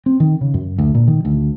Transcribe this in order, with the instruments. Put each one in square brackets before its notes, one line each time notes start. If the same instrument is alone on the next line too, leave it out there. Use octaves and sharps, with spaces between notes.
[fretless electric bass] C4
D#3
C#3
F#2
D2
A#2
D#3
D2